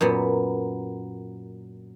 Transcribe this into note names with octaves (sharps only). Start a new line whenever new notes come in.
F#2 A#2 B3